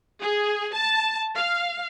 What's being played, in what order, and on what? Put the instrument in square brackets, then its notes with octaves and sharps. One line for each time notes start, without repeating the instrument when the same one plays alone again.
[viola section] G#4
A5
F5